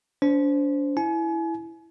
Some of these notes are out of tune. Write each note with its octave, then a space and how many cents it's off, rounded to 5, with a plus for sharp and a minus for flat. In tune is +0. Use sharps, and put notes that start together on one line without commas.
D4 -40 C5 -10
E4 +0 G#5 +35